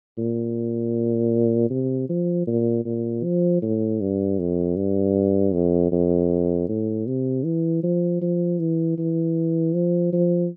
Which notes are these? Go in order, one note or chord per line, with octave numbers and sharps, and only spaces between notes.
A#2
C3
F3
A#2
A#2
F3
A2
G2
F2
G2
F2
F2
A2
C3
E3
F3
F3
E3
E3
F3
F3